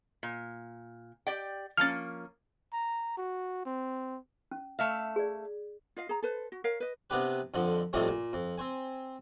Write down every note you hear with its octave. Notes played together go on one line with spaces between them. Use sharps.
A#2
G4 D5 G5
F3 A#3 C#4 F6 A6
A#5
F#4
C4
C#4
A3 E5 F5
G#4 D5
F4 D#5 F5
G#4 A#5
A4 B4 C5
F#4
A#4 C#5 F5
B4 D#5
C3 B3 D4 G4 B4
F2 D3 F3
D#2 A2 C3 F3 G3 A3
A#2
F2
C4 C5 G#5